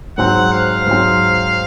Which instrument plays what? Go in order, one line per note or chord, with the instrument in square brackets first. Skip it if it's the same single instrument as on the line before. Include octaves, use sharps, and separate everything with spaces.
[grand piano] G#2 F#3 C4 [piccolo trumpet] F#5
[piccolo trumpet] F5
[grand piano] G#2 F#3 C4